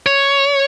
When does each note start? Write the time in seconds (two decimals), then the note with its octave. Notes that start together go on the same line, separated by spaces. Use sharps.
0.06 C#5